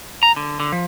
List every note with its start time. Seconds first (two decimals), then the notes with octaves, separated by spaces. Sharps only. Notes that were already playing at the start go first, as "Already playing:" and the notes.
0.23 A#5
0.36 D3
0.60 D3
0.72 F3